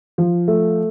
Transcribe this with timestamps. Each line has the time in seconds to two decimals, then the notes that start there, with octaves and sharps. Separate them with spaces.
0.18 F3
0.48 A3